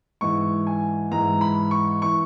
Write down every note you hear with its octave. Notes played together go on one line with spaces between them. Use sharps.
G#2 E3 C#6
G#5
G#2 E3 A#5
B5
C#6
E3 C#6